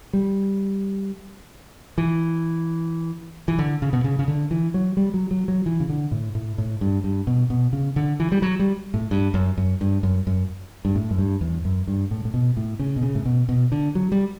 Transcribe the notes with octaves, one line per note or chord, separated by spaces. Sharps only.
G3
E3
E3
D3
C#3
B2
C#3
C#3
D3
E3
F#3
G3
F#3
F#3
F#3
E3
C#3
D3
A2
A2
A2
G2
G2
B2
B2
C#3
D3
E3
G3
F#3
G3
A2
G2
F#2
F#2
G2
F#2
F#2
G2
A2
F#2
G2
E2
F#2
G2
A2
A2
B2
A2
C#3
B2
C#3
A2
B2
B2
D3
F#3
G3